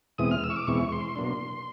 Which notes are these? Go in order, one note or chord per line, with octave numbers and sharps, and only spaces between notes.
E2 B2 G#3 C4 E4 D#6
F6
E6
C#6
D6
E2 B2 G#3 C4 E4 C#6
C6
B2 F#3 A#3 D4